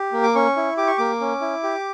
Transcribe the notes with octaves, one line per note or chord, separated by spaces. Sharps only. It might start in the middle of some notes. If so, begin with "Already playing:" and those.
Already playing: G4
A#3
D6
C#4 C#6
E4
G4 D6
C#6
A#3 D6
C#4
E4
G4